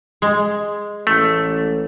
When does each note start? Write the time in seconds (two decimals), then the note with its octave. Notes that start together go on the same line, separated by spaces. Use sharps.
0.22 G#3
1.07 A1 A3